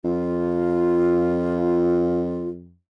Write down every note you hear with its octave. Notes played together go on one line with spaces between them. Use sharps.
F2 F4